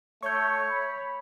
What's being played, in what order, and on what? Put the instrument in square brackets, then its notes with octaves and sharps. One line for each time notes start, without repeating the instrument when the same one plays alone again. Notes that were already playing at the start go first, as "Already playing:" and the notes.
[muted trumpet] A3 [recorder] C#5 [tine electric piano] C#6 G6
[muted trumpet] B5